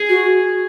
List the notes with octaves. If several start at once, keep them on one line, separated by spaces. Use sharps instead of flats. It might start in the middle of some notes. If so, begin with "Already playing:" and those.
Already playing: G#4
F#4